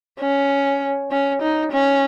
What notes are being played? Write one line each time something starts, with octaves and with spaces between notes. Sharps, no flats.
C#4
C#4
D#4
C#4